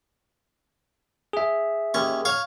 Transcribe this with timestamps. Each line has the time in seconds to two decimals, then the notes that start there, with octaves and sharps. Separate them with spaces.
1.33 G#4 E5
1.94 D#2 C#4 C#6
2.25 C#5 F5 C#6